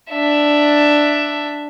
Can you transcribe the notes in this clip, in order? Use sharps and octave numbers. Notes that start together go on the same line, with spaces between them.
D4 E5